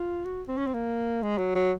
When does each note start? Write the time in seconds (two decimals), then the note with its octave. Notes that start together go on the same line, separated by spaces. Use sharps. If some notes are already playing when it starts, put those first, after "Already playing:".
Already playing: F4
0.25 F#4
0.48 C4
0.58 C#4
0.67 C4
0.74 A#3
1.23 G#3
1.38 F#3
1.55 F#3